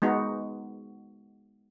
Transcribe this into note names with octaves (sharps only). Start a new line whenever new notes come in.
G#3 B3 D#4 F#4